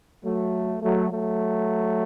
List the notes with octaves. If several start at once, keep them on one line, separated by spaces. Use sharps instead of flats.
F#3 A3
F#3 A3
F#3 A3